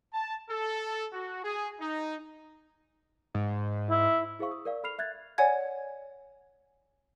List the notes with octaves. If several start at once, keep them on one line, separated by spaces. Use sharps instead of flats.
A5
A4
F#4
G#4
D#4
G#2
E4
E4 G#4 C5 F5 C#6
D#6
A#4 D5 F5
A4 B5 F6 C7 F7
E5 F#6 G#6 A6
C#5 D5 F#5 G#5 G#6